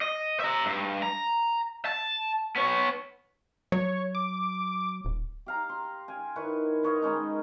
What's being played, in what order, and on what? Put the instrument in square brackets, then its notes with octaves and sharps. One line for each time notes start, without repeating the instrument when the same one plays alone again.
[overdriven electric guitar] D#5
E5 A#5
G2
A#5
A5
B3 C#5
[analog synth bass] F#3 [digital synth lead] C#5
[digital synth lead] D6
[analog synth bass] D#1
[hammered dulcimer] G4 F5 A#5
C6
F5 G5 G#5
D#3 E4 B4 C#5
B4 C#5 D#5 F5
D#3 G#3 C#4 D#4